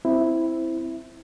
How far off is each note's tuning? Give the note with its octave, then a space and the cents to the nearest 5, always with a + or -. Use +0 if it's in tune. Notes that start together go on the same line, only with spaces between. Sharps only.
C4 +0 E4 +0